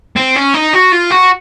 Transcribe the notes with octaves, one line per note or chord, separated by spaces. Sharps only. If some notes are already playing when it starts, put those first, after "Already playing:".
C4
C#4
D#4
F#4
F4
F#4